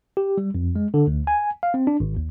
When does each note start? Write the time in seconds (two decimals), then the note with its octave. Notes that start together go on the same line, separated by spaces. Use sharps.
0.17 G4
0.38 G3
0.55 F2
0.76 G#3
0.94 D3
1.07 D2
1.27 G#5
1.63 F5
1.74 C4
1.87 D4
2.00 G#1
2.17 D#2